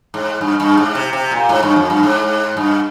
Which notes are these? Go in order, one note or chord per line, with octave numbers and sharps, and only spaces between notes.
G#2
G2
G2
G#2
C3
C3
A#2
G#2
G2
F2
G2
G#2
G2